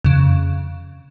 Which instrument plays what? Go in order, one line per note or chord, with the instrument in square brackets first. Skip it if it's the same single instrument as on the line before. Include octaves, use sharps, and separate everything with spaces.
[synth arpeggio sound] F2 C#3